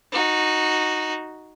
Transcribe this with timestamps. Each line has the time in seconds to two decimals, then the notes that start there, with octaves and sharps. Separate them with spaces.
0.12 D#4 F#4